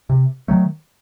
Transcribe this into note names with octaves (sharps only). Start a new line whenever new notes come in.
C3
D#3 F#3 A3